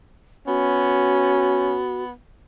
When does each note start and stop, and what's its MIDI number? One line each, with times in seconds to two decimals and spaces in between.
0.47 2.12 59
0.47 1.79 61
0.47 2.03 66